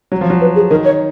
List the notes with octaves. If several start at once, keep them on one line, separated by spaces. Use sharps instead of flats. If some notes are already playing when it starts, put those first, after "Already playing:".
F#3
F3
F#3
B4
G#4
D#3 A#4
C#5